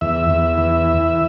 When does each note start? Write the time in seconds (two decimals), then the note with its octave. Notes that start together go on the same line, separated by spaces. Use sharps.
0.01 E2 E5
0.30 E2
0.58 E3